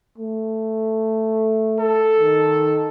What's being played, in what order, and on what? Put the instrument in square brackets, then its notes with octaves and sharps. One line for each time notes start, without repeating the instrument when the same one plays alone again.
[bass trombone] A3
[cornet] A4
[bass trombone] D#3